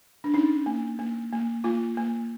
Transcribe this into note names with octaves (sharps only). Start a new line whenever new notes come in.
D4
C#4 D#4
A#3
A#3
A#3
A#3 F4
A#3